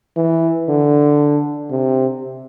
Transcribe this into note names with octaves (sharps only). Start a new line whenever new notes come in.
E3
D3
C3